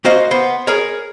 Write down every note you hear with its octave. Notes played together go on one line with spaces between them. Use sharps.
A#3 F#4 C5 D#5 F5
B3 C5
G#4 A#4 C#5